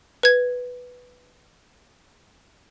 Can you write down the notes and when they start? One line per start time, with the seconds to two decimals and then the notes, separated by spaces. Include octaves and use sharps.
0.23 B4 G#6